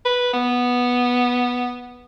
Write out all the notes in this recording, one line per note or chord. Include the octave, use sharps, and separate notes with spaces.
B4
B3